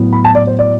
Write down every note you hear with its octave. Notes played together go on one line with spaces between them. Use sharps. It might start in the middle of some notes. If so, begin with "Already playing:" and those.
Already playing: A2 F#3 B3
B5
A5
D5
C5
D5